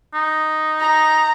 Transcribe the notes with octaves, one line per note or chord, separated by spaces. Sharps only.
D#4
A#5